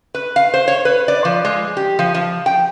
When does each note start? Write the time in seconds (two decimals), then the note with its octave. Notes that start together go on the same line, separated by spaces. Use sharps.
0.15 B4
0.36 F5
0.54 C5
0.68 C#5
0.85 B4
1.08 D5
1.25 F3
1.45 G#3
1.77 G4
1.99 F3
2.15 F3
2.46 G5